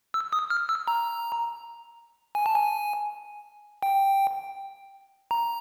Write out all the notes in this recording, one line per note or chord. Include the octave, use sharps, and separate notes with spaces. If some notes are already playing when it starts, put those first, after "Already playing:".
E6
D#6
F6
E6
A#5
G#5
A5
G#5
G5
A#5